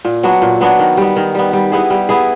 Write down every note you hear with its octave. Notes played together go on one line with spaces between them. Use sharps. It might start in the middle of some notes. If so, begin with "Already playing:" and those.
A#2
F#3 B3 D4
A#2
F#3 B3 D4
D#3
G3 B3
D#3
G3 B3
G3
B3 E4 G#4
G3
B3 E4 G#4